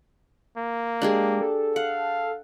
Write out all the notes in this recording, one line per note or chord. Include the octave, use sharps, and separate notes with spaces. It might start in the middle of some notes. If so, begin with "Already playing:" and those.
A#3
G#3 D4 G4 G#4
A4
F5 F#5